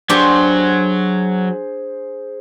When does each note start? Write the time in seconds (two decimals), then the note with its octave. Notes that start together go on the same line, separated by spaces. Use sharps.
0.09 F#3 D4 G4 G#4 C5